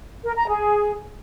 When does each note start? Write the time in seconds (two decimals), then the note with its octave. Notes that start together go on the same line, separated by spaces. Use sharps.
0.24 A#4
0.36 A#5
0.47 G#4